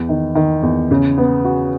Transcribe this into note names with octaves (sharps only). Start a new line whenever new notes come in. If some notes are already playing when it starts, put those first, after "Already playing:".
Already playing: E2
D#3
D#3
E2
C#3
B3
F#4